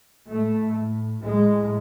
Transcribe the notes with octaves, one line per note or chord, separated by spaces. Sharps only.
A2 A3
A2 G#3